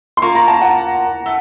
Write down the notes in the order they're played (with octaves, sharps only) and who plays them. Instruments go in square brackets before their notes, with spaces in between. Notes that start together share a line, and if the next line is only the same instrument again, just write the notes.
[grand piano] C6
[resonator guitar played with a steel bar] A#3 F4 A#4 [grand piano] C#6
[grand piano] A#5
A5
F#5
[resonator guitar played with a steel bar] A3